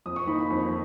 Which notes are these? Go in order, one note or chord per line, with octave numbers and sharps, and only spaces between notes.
F2 D#6
C#6
D#3 A#3 D#4 B5
B5
F2